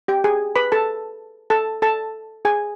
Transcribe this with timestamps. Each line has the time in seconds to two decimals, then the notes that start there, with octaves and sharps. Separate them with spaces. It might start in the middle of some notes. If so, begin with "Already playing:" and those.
0.08 G4 G5
0.24 G#4 G#5
0.56 B4 B5
0.72 A4 A5
1.50 A4 A5
1.82 A4 A5
2.45 G#4 G#5